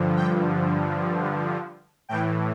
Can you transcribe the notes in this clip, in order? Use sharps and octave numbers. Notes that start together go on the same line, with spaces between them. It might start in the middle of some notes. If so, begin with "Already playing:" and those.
Already playing: G2 D3 F3
G5
A2 E3 G5